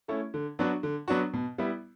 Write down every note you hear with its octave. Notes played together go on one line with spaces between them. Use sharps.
A3 C#4 E4
D3
F#3 B3 D4 F#4
D3
F#3 B3 D4 F#4
B2
G3 B3 E4